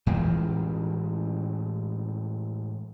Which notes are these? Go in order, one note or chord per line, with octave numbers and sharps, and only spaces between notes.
A2 E3 F3 G#3